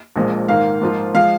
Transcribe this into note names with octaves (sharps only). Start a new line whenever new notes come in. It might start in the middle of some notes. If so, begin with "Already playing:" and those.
A#1 A#2 F3 G#3
G#2 D#3 A#3 F5
G#2 F3 A#3 F4
F3 G#3 F5